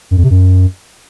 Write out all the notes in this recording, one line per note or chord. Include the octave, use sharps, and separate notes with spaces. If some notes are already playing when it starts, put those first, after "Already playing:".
F#2
F2
C3
F#2